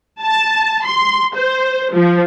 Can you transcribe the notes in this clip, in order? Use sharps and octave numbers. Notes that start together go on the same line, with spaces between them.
A5
C6
C5
F3